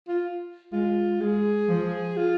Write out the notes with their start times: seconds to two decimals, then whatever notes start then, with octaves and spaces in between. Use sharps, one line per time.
0.08 F4
0.72 G#3 F4
1.20 G#3 G#4
1.68 F3
2.17 F4